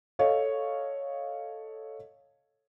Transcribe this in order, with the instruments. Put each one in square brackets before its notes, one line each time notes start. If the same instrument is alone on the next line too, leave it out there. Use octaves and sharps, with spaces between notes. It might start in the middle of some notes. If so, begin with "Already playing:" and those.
[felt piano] A4 C#5 D#5 F5